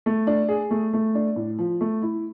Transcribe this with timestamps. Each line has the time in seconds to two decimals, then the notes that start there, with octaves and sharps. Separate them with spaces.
0.06 A3
0.27 D4
0.49 G#4
0.71 A3
0.93 A3
1.15 D4
1.36 A2
1.59 F3
1.81 A3
2.02 E4